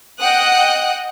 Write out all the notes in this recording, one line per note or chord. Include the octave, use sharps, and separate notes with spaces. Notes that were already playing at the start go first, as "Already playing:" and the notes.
D#5 F#5 G5 D#6 F#6